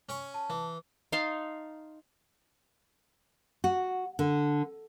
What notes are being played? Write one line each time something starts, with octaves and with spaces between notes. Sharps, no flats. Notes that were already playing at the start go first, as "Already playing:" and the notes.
C#4 G#5 C#6
A5
E3
D#4 F5 A5 C6
F#4
D3